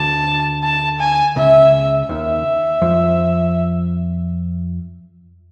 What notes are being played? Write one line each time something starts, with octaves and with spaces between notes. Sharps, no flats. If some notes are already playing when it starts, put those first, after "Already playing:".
Already playing: D2 D3 A5
A5
G#5
C#2 C#3 E5
D#2 D#3 E5
F2 F3